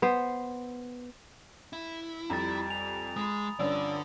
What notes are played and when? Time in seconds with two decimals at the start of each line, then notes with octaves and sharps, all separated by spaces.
0.02 B3 C5
1.73 E4
2.30 F2 G3 A#5 A6
2.70 G#5 F7
3.17 G#3 B5 D#6
3.60 G2 D3 F3 C#4 D5 E6